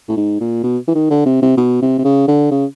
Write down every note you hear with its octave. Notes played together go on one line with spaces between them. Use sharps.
A2
G#2
A#2
B2
E3
D#3
D3
C3
C3
B2
C3
C3
C#3
D3
C#3